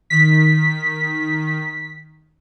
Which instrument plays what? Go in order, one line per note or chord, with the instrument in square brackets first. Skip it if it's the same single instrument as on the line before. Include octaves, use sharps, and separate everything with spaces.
[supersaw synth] D#3 [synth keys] B6